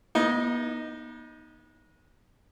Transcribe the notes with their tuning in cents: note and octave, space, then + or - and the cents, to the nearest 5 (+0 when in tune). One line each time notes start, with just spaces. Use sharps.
B3 -35 D#4 +0